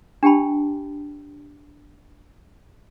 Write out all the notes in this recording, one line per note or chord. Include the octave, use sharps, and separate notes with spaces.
D4 G4 G5 A5 B5